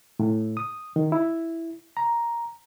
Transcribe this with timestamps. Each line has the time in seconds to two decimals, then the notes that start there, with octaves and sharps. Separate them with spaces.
0.19 A2
0.57 D#6
0.96 D#3
1.12 E4
1.97 A#5